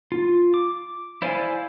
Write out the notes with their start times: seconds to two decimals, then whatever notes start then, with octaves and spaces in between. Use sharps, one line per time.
0.12 F4
0.54 D6
1.22 E4 C5 D5 F5 G#5